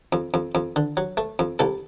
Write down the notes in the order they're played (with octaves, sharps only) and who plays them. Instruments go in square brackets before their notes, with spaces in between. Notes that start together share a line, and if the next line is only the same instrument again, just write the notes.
[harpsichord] F2
F2
F2
D3
F#3
A3
F2
C2 A4